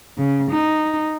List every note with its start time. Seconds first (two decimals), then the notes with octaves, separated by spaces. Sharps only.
0.17 C#3
0.51 D#4